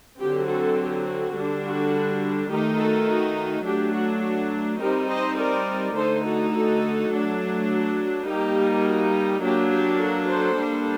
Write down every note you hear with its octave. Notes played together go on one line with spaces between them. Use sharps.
D3 F#3 C4 G4
F#4 A4
G4
F#4
D3 G3 D4
F#4
D#3 A3 D#4 G4
F#4 A4
F#4
F#3 A3 D4 G4
F#4
F#4
G3 C4 D#4 G4 A#4
C5 D#5
A#4 D5
D3 A3 D#4 A4 C5
F#4 A4
F#4 A4
F#3 A3 D4
F#4
G3 A#3 D#4 G4
F#4
G4
F#3 A#3 D4 G4
G4
F#4 A4
A4 C5
G3 A#3 D4